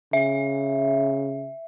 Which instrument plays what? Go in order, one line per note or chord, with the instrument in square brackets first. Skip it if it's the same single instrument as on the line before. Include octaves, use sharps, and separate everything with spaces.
[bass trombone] C#3 [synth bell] E5